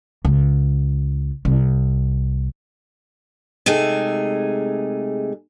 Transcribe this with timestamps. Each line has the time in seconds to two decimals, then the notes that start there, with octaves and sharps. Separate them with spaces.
0.25 C#2
1.45 C2
3.66 C3 G#3 A3 D#4 G#4